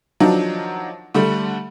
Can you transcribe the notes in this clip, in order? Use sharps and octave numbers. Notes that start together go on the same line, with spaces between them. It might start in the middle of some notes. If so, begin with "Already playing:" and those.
D#3 F3 F#3 D4
D3 G3 A3